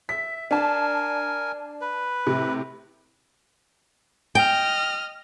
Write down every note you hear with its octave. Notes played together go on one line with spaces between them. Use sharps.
E5 B6
D4 A#4 G#5 A5
B4
A2 C3
D#5 G5 F6